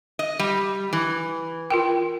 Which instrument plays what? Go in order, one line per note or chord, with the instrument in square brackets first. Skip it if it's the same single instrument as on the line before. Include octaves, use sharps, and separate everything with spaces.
[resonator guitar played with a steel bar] D#5
G3
E3
[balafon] F4 A#4 G5